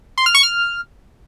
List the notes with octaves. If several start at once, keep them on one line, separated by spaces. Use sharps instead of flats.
C6
F6
C#6
F6